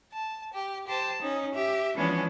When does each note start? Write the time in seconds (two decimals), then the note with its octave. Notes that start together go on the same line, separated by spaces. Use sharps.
0.14 A5
0.54 G4
0.88 G4 C5 A5
1.21 C#4 D#4
1.54 G4 E5
1.95 E3 F3 G#3 B3 C#4 D4